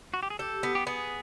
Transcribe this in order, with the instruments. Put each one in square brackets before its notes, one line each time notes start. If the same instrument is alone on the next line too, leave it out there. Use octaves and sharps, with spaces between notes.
[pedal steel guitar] F#4
G4
G#4
[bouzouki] G4 [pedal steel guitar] A4
[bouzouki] B3
[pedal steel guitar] G4
[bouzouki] B3 [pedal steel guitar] G#4